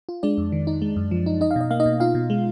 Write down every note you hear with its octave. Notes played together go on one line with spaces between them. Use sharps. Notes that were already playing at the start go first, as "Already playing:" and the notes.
F4
G#3 D4 D5
F2
D#3
D#4
G#3
F#2
F3
D#4
D#4 D#5
F5
B2 D#5
A#3 F5
D#4 D#5
B2
D#4 F4 F5
B2
G#3